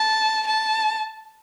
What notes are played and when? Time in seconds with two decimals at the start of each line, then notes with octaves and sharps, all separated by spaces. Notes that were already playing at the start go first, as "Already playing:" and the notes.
Already playing: A5
0.47 A5